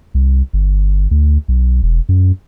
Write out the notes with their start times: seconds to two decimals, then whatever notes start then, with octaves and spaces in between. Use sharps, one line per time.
0.14 C2
0.53 G1
1.11 D2
1.48 B1
1.83 E1
2.09 F#2